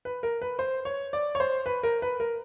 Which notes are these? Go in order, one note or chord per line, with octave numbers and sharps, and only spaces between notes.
B4
A#4
B4
C5
C#5
D5
C#5
C5
B4
A#4
B4
A#4